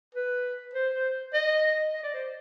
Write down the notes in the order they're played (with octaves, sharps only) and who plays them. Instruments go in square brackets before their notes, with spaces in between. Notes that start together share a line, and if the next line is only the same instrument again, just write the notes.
[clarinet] B4
C5
C5
D#5
D#5
D5
C5